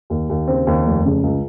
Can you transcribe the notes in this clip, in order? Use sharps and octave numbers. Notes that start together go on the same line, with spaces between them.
D#2
D#2
C#3 C4
D#2
F1
C#3
C#2